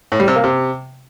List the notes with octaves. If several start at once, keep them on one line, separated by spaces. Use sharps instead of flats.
A2
G3
C3
A#3
C3